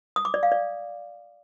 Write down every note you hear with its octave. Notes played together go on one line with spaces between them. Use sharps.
D#6
D6
D5
F5
D5